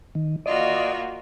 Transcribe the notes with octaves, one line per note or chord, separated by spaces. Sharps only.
D#3
A#3 F4 F#4 D5 D#5